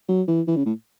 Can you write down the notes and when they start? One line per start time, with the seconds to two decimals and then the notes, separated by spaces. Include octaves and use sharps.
0.09 F#3
0.28 E3
0.47 E3
0.56 C#3
0.66 A2